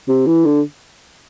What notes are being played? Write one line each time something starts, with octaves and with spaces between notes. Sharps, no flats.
C3
E3
D3